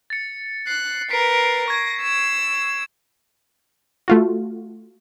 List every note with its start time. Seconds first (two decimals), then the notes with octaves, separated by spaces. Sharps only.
0.10 A6 C#7
0.67 F#6 C7
1.11 A#4 B4 B6 C7 D7
1.68 C#6 G#6 A#6
2.02 E6
4.08 A3 F4 F#4